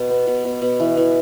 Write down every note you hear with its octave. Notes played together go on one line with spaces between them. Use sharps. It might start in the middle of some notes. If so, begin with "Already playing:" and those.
Already playing: B2
B3
B2
B2
B2
E3
E3